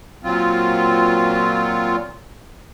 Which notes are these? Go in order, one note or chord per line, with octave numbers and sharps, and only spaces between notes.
A#2 F#3 C4 F4